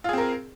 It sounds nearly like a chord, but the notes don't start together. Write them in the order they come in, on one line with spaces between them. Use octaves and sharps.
F4 G#4 C4 A#4